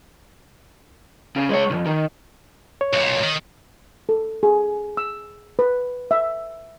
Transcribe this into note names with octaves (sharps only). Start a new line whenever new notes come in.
C#3
G#3 C#5
B1 F2
D#3
C#5
B1 A#2
D#3
A4
G#4
E6
B4
E5